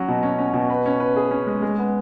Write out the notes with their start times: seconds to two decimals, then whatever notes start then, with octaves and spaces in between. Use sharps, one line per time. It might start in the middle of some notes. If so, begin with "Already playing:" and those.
Already playing: F#3 C#4
0.08 B2
0.23 C#4
0.39 C#4
0.54 B2
0.70 B4
0.86 C#4
1.00 B4
1.16 G#4
1.31 C#4
1.46 G#3
1.62 G#3
1.79 B3